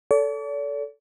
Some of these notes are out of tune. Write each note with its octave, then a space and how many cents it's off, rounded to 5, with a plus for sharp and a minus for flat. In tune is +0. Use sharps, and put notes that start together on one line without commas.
A4 +0 D5 -45